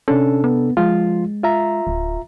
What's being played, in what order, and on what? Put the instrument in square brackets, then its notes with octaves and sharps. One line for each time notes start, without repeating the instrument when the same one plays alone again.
[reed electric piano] C3 D4 A4 [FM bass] C#4
[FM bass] B3
[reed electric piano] F3 F4 [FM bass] G#3
[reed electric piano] F4 E5 A#5
[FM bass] D1